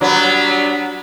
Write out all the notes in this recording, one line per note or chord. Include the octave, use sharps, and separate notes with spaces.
F#3 G3 B3 D4